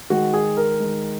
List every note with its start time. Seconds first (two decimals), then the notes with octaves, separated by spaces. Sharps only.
0.10 D#3 G#3 F#4
0.34 G#4
0.57 A#4
0.80 D#3 G#3